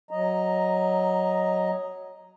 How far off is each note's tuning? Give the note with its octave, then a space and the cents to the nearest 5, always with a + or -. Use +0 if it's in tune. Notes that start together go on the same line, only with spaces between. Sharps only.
F#3 +0 D#5 +0 A#5 +0